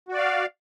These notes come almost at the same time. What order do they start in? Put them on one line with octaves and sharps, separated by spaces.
F#4 D5 F5